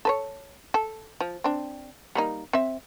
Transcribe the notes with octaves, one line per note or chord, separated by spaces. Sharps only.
A4 B4 C#5
A4
F3
C4 D4
G3 A#3 D#4
C4 E5